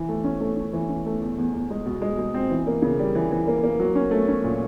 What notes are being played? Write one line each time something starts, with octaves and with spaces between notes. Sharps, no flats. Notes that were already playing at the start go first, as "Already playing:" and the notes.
Already playing: E3
A3
C#4
A3
C#4
E3
C#4
A3
E2
E2
E2
G#3
B2
G#3
G#3
C4
E3
A#3
C#3
G3
E3
E3
A#3
A#3
F#3
C#4
A3
C#4
A#2